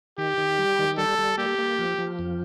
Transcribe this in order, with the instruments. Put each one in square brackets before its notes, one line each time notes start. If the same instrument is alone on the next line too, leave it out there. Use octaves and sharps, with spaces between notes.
[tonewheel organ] D#3 [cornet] G4
[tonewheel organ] D#3
G3
D#3
[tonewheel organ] G3 [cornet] A4
[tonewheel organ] G3
[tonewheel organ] A#3 [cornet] G4
[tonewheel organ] A#3
F3
F3
F2